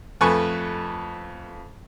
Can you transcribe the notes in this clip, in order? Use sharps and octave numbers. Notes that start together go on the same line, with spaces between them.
F2 A3 B4 G#5 C#6